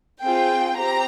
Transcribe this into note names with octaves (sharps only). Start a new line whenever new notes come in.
C4 F4 G#4 G5
C4 G4 A#5